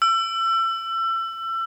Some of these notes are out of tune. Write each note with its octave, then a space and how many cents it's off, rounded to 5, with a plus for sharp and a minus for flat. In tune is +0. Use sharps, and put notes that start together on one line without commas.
E6 +30